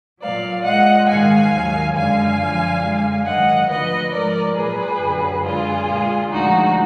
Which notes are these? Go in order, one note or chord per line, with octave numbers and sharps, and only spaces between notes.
A#2 F#3 D5 F5
A#2 G#3 D#5 F#5
G#2 D#3 G#3 F5 G#5
D#2 D#3 F#3
F#2 D3 G#3 F5 G#5
F#2 D3 F3
F#2 D3 G#3
G#2 D#3 F#3 D#5 F#5
D2 D3 F3 B4 D#5
G#2 F3 G#3 A#4 D5
A#2 F#3 G#4 B4
F#2 D3 F#3
F#2 D3 G#3 F4 G#4
A#2 G#3
D2 D3 F3 G#3 D#4 F#4